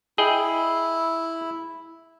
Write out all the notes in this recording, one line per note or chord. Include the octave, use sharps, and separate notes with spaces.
E4 G#4 D#5 G5